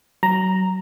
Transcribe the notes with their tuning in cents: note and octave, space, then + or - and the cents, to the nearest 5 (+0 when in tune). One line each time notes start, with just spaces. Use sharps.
F#3 +30 A#5 +0